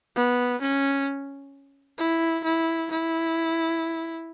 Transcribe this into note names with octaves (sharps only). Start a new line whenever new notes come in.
B3
C#4
E4
E4
E4